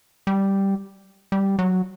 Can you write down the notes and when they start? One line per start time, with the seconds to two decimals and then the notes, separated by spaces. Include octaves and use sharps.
0.27 G3
1.32 G3
1.59 F#3